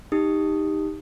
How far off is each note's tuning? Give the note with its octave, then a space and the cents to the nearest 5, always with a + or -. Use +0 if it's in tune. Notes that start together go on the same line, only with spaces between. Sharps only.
D#4 +0 G4 +15 D#6 +0